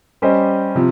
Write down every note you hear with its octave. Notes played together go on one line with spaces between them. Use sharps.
G3 C#4 G4 C5 D#5
C3 F3